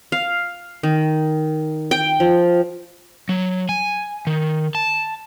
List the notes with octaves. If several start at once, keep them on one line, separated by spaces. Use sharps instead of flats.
F5
D#3
G5
F3
F#3
G#5
D#3
A5